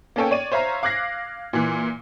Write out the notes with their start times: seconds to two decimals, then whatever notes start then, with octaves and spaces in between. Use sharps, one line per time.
0.16 A#3 B3 C#4 A4 C#5 G5
0.31 C#5 D5 D#7
0.52 C5 C#5 E5 F5 A#5
0.83 F5 D6 F#6 G#6 A#6 C7
1.53 A#2 E3